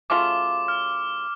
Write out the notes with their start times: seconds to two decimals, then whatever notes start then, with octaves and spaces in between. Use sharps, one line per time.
0.10 C#3 F#3 A3 F4 D6
0.68 F6